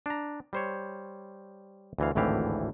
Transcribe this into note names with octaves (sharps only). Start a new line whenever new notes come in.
D4 A#5
G3 C5 C#5
D2 E3 F5
G#1 D2 A2 E3 G4 F5